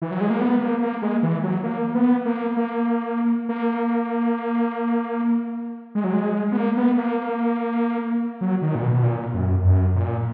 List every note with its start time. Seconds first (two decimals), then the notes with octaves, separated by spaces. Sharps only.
0.02 E3
0.11 F#3
0.21 G#3
0.30 A#3
0.40 B3
0.61 A#3
0.82 A#3
1.02 G#3
1.23 E3
1.43 F#3
1.63 A#3
1.95 B3
2.25 A#3
2.57 A#3
3.49 A#3
5.95 G#3
6.04 F#3
6.13 G#3
6.52 B3
6.56 A#3
6.77 B3
6.97 A#3
8.41 F#3
8.62 D#3
8.75 A#2
8.82 B2
8.94 B2
9.03 A#2
9.34 F#2
9.65 F#2
9.96 A#2